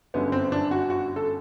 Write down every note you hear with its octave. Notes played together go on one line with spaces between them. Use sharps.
G1 F#2 D3 B3
C4
D4
F#4
F#4
A4